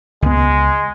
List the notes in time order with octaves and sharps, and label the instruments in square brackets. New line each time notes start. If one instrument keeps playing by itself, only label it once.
[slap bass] C#2 B3 [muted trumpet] G#3